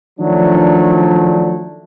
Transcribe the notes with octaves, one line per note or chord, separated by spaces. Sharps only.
D#3 F3 F#3 A3 D4